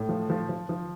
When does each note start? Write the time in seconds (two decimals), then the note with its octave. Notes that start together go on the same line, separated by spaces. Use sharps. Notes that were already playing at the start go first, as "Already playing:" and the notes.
Already playing: A2
0.09 F3
0.30 F3
0.49 F3
0.69 F3